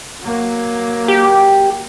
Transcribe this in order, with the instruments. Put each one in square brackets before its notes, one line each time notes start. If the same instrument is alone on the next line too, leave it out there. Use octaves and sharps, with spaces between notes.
[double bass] F#3 A#3
[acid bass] G4